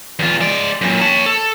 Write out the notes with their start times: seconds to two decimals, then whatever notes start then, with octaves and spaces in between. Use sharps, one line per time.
0.19 E2 F4
0.41 G#3 D5
0.81 F#2 A#2
1.01 C#5 A5
1.26 A4